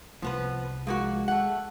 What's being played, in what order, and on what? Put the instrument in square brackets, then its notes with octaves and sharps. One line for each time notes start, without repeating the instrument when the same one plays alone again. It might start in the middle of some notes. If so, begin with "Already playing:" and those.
[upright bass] C2 F4 [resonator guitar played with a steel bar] F3 B3 B4
[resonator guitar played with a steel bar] F3 A#3 F#4 [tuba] G#3
[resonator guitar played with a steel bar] A3 F#5